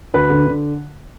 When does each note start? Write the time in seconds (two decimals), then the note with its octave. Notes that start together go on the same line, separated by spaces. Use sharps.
0.14 D2 B4
0.30 D3
0.46 D3